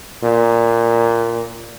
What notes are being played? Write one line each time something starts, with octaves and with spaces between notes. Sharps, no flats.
A#2